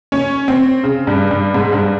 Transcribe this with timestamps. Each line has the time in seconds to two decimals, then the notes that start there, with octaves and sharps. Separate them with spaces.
0.12 C#4
0.48 C4
0.84 C#3
1.07 G2
1.31 G2
1.54 G#2
1.73 G2